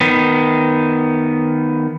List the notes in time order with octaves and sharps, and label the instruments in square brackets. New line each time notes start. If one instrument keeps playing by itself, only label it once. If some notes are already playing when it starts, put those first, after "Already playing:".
[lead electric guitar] D#3 B3